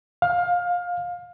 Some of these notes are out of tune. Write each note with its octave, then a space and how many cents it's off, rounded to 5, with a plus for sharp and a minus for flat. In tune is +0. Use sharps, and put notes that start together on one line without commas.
F5 +20